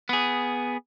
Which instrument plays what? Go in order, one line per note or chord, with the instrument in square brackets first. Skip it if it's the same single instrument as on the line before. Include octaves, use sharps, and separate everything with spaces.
[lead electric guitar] B3 G#4